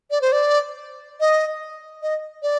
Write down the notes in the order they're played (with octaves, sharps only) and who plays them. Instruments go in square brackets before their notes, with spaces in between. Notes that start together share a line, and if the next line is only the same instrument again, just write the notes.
[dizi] D5
C5
D5
D#5
D#5
D5